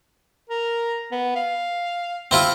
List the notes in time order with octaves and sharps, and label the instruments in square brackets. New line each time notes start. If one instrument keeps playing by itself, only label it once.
[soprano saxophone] A#4
B3
F5
[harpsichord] C4 E4 F4